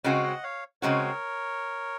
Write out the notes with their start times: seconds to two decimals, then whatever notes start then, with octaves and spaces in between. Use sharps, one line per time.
0.04 C#3 G#3 C4 F#4 C#5 F5
0.23 D#5 F#5
0.43 C#5 F5
0.82 C#3 G#3 C4 F#4 A#4 C#5